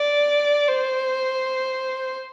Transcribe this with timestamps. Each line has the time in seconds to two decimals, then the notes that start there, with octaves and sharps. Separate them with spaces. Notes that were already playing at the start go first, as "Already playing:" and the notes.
Already playing: D5
0.68 C5